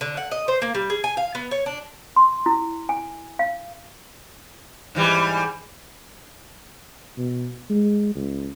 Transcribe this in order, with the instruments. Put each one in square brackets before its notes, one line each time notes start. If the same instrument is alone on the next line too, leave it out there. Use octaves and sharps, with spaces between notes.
[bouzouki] D3
F#5
D#5
C5
A#3
G3
G#4
G#5
F5
B3
C#5
D4
[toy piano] C6
E4
G#5
F5
[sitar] G#2 E3 G3
[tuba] B2
G#3
C#2